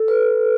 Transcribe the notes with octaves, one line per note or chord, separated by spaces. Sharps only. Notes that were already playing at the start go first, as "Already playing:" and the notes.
Already playing: A4
B4